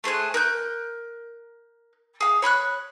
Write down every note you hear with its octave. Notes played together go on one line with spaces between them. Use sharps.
A3 G#4 C5 F#6
A#4 F#6 G6
G#4 F5
C#5 B5 C#6 F#6